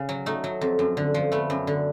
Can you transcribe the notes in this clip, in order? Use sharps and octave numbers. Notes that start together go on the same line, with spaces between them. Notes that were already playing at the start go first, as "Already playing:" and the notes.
Already playing: C#3
F#3
A3 D#4
F#3
F2
F#2
D3
F3
A3 B3
F#2
D3